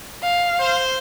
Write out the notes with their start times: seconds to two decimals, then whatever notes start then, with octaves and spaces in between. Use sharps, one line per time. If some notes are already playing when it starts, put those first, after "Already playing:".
0.23 F5
0.59 C5